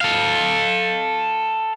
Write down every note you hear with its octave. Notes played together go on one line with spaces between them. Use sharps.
A4 F5